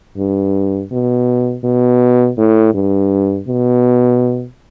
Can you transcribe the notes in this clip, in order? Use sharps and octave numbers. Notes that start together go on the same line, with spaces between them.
G2
B2
B2
A2
G2
B2